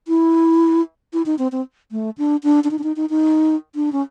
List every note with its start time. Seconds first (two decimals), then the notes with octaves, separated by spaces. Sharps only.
0.08 E4
1.13 E4
1.26 D#4
1.39 C4
1.52 C4
1.92 A3
2.18 D4
2.43 D4
2.64 D4
2.71 D#4
2.79 D4
2.84 D#4
2.96 D#4
3.10 D#4
3.75 D4
3.92 C#4